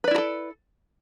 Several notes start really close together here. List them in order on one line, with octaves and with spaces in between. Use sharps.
B4 D5 E4 F#4 A4